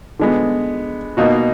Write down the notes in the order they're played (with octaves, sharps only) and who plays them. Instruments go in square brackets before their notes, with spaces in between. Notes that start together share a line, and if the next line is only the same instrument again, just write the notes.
[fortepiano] D3 G#3 B3
B2 A#3 D#4 F#4